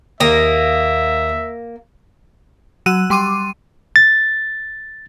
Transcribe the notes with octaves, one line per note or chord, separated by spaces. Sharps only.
D#2 A#3 E5 D#6
F#3 E6 F#6 D#7
G3 C6 D6 D#7
A6